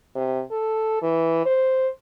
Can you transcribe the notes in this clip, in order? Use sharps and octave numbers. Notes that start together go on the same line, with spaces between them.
C3
A4
E3
C5